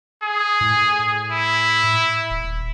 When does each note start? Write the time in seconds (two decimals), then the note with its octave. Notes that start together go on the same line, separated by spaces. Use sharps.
0.23 G#4
0.61 A2
1.32 E4
2.30 D#1